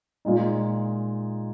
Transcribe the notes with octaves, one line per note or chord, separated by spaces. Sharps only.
A#2 G#3 D#4